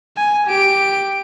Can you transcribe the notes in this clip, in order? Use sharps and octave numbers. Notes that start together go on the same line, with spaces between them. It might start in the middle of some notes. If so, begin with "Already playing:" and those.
G#5
G4 D7